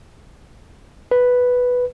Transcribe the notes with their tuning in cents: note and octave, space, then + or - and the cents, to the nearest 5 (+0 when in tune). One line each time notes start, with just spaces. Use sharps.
B4 +0